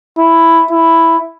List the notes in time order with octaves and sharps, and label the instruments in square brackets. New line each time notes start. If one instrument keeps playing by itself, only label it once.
[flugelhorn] E4
E4